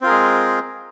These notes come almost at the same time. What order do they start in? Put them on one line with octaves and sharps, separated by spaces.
C4 F4 A#4 G#4 G#3